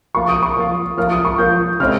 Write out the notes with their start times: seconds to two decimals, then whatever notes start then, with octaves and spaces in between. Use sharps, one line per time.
0.14 F3 A#3 F4 C#6
0.28 D#6
0.43 C#6
0.56 F3 A#3 F4
0.97 F3 A#3 F4 F6
1.11 D#6
1.25 C#6
1.38 F3 A#3 F4 G6
1.80 C#3 G#3 C4 F6